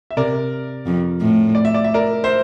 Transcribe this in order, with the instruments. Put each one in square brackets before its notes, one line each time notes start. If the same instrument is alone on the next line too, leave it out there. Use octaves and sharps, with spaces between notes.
[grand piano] E5
[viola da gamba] C3 [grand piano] A#4 D5
[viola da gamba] F2
A2
[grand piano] D5
E5
D5
E5
A#4 D5
C5 E5